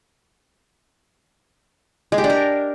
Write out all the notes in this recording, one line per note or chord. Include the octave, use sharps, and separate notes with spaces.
G#3
G4
D4
A#4